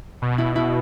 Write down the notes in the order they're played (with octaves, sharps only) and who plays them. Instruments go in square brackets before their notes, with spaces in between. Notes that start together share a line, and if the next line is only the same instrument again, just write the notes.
[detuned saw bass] B2
[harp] E4
E4